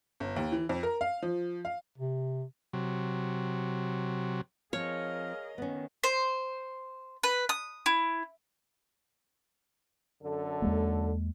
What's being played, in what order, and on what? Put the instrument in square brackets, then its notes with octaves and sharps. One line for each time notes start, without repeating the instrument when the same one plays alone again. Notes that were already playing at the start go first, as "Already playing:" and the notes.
[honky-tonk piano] G1
D#2
E3
F2
A#4
F5
F3
F5
[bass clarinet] C3
[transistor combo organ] C3 F#3
[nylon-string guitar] F3 C4 [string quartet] G#4 A#4 D#5 [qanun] C#5 [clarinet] F5
[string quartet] D#3 [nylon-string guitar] B3 C#4
[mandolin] C5
B4
D#6
E4
[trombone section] F#2 D3 A4
[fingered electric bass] E2 G#3 A#3